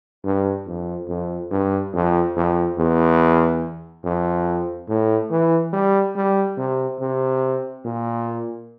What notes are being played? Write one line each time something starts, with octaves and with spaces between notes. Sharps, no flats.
G2
F2
F2
G2
F2
F2
E2
F2
A2
E3
G3
G3
C3
C3
A#2